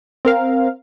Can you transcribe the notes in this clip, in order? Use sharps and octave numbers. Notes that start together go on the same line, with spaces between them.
C4 A#4 F5